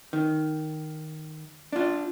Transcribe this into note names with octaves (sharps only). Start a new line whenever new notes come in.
D#3
D4 F4